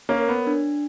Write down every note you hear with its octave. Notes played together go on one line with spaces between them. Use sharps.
A#3 C#4
A#4 C#5
B3
D4